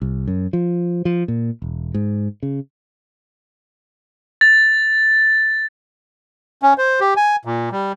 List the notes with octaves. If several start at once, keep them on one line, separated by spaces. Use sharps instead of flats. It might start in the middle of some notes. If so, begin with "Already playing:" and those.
C2
F#2
F3
F3
A#2
E1
G#2
C#3
A6
C#4
C5
G4
G#5
A#2
G3